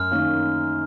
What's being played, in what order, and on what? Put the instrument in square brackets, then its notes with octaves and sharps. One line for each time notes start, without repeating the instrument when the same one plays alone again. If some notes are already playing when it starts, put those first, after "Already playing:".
Already playing: [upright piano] F#2 [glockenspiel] F6
[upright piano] D#3 A#3 C#4